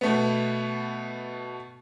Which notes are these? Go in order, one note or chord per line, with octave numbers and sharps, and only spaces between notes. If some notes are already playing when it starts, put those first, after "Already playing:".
B2 A3 B3